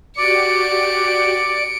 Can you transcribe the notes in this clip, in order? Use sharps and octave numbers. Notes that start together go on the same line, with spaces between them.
F#4 G4 D5 C#7 D7